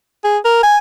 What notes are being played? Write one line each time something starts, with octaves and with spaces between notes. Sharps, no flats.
G#4
A#4
G#5